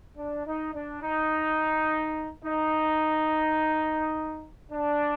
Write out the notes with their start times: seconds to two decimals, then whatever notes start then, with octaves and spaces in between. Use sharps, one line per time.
0.17 D4
0.46 D#4
0.74 D4
1.02 D#4
2.44 D#4
4.71 D4